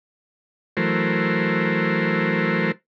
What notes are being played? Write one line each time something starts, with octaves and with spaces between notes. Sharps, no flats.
E3 F#3 A3 A#4 C5